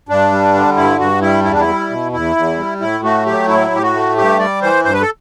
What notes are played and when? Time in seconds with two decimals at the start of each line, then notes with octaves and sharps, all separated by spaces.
0.09 G2 D4
0.31 G3
0.54 D3
0.77 G2 E4
0.99 G2 F#4
1.22 G3 E4
1.44 E2 E4
1.53 D4
1.61 E4
1.68 G3
1.90 B2
2.13 E2 E4
2.36 E2
2.58 G3
2.80 A2 E4
3.04 A3 F#4
3.26 F#3 G4
3.48 A2 E4
3.71 A2 G4
3.83 F#4
3.94 A3
4.17 G2 G4
4.39 G3 D5
4.62 E3 C5
4.85 G2 C5
4.93 B4
5.02 A4